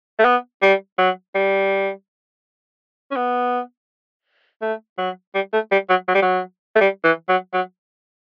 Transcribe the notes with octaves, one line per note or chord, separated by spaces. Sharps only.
A3
B3
G3
F#3
G3
C#4
B3
A3
F#3
G3
A3
G3
F#3
F#3
G3
F#3
A3
G3
E3
F#3
F#3